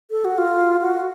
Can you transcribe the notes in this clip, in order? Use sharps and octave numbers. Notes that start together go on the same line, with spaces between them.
A4
F#4
F4
F#4